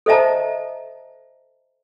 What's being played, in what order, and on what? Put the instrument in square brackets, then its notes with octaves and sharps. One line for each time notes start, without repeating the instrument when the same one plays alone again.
[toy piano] A4 C5 D#5 E5 A5 A#5